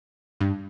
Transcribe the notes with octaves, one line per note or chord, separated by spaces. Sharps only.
G2